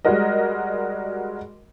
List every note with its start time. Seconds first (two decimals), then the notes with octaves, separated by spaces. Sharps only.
0.05 G3 G#3 F#4 A#4 D#5